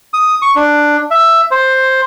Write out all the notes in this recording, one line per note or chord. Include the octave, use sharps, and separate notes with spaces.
D#6
C#6
D4
E5
C5